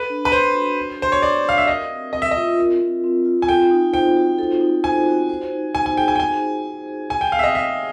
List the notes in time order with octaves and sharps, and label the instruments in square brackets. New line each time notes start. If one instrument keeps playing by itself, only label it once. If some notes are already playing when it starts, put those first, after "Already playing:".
Already playing: [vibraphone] A4 [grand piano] B4
[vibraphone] D4
[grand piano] B4
[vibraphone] D4 [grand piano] C5
[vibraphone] F#4
A4
[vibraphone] D4 [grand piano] C5
[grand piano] C#5
[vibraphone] D4 [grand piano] D5
[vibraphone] F#4 [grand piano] F5
[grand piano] E5
[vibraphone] A#4 [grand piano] D#5
[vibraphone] C4
[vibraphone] C4 [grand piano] D#5
[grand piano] E5
[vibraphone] F4 [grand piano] D#5
[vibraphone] A#4
C4
C4
F4
[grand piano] G#5
[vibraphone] A4 [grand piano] G5
[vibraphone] D#4
[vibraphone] C5 [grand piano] G5
[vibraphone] F#4
A4
D#4
[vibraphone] C5 [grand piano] G#5
[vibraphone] F#4
C5
D#4
[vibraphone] D#4 [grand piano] G#5
[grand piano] G#5
[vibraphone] G#4 [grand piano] G5
[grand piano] G#5
G5
[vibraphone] C5 [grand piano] G#5
[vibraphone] D#4
D#4
G#4
[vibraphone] G#4 [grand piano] G#5
[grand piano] G5
[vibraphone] C4 [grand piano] F5
[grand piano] E5
D#5
[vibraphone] C#5 [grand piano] E5